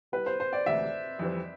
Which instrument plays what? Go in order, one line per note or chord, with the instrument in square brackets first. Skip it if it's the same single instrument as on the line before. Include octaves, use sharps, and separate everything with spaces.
[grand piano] C3 G3 B3 E4 [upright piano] B4
[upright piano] C5
C5
D5
[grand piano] E1 D2 C3 E3 [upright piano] E5
[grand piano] F2 E3 G3 C4